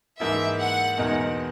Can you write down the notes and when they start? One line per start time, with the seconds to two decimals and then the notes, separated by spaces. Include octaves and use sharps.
0.20 G#2 E3 A#3 E4 E5
0.59 F#5
0.98 E2 B2 G#3 D#4 A#4